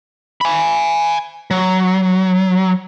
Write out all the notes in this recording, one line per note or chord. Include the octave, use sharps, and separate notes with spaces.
G#5 B5
F#3